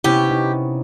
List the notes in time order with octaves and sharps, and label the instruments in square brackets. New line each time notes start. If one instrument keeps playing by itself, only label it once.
[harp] C3 B3 C#4 [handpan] E4 [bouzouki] G4
[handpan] D#4